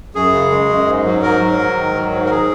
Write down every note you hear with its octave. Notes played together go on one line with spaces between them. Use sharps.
F#2 G#4
C#3
G#3
F#2
G#2
F#3
G#2 A#4
F#3
G#2
D#3
F#3
G#2
A#4
G#4